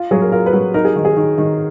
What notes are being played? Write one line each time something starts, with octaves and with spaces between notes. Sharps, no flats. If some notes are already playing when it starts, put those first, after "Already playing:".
Already playing: F4
F#3 G#4
A#4
F4 A#4
B4
F#3
D#4 A#4
G#4
D#3
G#4
D#3
D#3